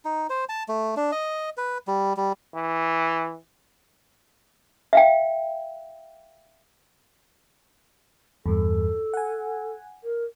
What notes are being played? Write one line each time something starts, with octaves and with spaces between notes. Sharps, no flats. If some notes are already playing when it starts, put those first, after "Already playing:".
D#4
C5
A5
A3
D4
D#5
B4
G3
G3
E3
E5 F5 G5
E2 G2 A4
F#5 G#5
A#4